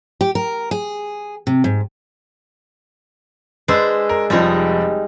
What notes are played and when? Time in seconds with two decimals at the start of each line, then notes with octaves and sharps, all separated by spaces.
0.21 G4
0.35 A#4
0.71 G#4
1.47 C3
1.64 G#2
3.68 G#3 D4 B4 C5 E6
4.09 A#4
4.30 F1 F3 G3 G#3 D#4